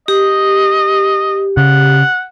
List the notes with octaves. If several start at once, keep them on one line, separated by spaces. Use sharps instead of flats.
G4 D#5
C#3 F#5